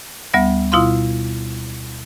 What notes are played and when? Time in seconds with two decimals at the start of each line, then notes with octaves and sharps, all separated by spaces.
0.34 D2 G3 B3 E5
0.72 B2 E4 F4 F5 C6